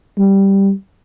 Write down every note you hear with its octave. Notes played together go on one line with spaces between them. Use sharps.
G3